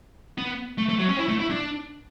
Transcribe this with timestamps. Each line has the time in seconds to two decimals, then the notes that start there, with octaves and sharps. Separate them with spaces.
0.38 B3
0.78 A3
0.89 A3
0.99 F#3
1.09 C#4
1.19 E4
1.29 A3
1.39 E4
1.50 D4